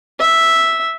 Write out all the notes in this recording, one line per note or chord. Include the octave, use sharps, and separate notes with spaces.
E5